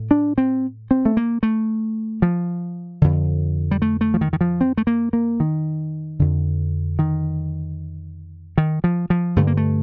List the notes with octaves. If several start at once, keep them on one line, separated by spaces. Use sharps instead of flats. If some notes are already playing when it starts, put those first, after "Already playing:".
Already playing: A2
D4
C4
C4
A3
A#3
A3
F3
F2 D3
G3
A3
A3
F3
D#3
D#3
F3
C4
A3
A#3
A#3
D#3
F2 D3
D#3
D#3
F3
F3
G2 D3 A3
A#3
A3